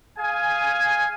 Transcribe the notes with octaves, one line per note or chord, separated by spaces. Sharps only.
G#4 F5 G#5